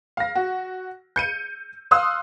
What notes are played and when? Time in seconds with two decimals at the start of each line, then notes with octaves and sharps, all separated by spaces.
0.17 F5 A#6
0.35 F#4
1.16 G6 C#7 D#7
1.91 F5 C6 D#6 E6 F#6